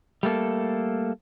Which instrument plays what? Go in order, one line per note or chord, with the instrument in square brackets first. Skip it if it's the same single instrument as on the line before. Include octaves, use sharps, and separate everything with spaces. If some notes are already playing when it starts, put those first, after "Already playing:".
[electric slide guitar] G3 A3 A#3 A4